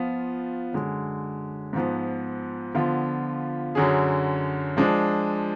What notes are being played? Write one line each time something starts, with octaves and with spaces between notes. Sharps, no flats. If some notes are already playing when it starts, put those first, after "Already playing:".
Already playing: F3 B3 F4
F#2 D3 G#3
G#2 F3 B3
D3 F3 B3 F4
F#2 D3 F#3 C#4 G#4
F3 G#3 D4